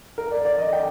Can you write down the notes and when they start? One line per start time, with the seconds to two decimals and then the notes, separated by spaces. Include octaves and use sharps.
0.18 A#4
0.31 D5
0.45 D5
0.58 D#5
0.73 G5